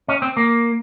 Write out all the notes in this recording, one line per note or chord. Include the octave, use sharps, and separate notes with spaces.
C#4
C4
A#3